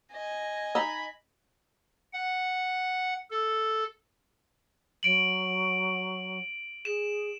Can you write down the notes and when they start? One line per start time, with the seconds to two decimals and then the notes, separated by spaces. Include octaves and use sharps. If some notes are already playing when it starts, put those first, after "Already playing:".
0.12 D#5 G#5
0.75 D#4 B5
2.13 F#5
3.30 A4
5.03 F#3 D7 F#7
6.85 G#4 E7